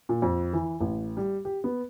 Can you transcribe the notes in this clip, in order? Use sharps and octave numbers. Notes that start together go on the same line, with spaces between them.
A#2
F2
E3
A1
G3
G4
B3